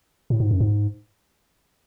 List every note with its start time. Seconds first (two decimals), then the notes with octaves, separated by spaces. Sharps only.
0.30 A2
0.40 G#2
0.51 F#2
0.60 G#2